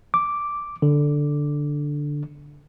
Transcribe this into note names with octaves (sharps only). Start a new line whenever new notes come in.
D6
D3